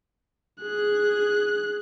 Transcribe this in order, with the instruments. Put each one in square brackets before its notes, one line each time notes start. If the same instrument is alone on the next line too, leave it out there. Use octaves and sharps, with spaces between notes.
[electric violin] G#4 F#6